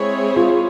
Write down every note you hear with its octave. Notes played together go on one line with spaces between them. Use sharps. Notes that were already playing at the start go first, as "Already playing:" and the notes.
Already playing: G#3 C4 E4 G#4 C#5
F4